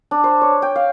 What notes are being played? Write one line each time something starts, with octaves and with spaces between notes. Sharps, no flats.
D4
C5
C#5
G5
F5